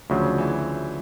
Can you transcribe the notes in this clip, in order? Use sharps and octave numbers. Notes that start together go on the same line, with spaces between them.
D2 C#3 F3 F#3
E3